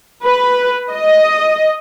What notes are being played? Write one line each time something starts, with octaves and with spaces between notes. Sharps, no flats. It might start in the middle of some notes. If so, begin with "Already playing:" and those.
B4
D#5